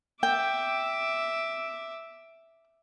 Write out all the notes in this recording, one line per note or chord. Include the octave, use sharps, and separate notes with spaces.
E5 G5 D6